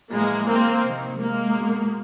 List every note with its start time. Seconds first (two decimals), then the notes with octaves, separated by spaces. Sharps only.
0.12 A2 E3 G#3 A#3
0.48 A#3 C4
0.84 C3 D#3
1.20 G#3 A#3
1.56 B2